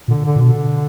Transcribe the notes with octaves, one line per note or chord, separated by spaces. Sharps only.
A#2 D3
D3
A#2
B2 D3